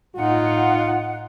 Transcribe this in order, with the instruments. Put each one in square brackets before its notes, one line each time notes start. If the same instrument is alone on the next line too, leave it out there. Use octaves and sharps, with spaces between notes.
[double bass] A2 D#4 [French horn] F4 [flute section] F#5